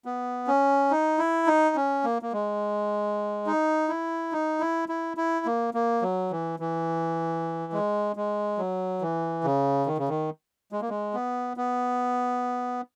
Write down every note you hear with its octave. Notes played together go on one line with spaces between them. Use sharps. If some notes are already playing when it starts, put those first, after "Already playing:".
B3
C#4
D#4
E4
D#4
C#4
A#3
A#3
G#3
D#4
E4
D#4
E4
E4
E4
A#3
A#3
F#3
E3
E3
G#3
G#3
F#3
E3
C#3
D#3
C#3
D#3
G#3
A#3
G#3
B3
B3